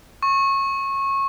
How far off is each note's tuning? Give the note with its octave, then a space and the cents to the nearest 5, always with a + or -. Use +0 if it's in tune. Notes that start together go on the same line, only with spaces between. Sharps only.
C#6 -20